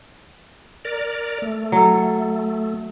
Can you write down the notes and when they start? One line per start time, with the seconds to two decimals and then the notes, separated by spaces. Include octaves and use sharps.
0.85 A#4 D5
1.42 A3
1.72 F#3 A4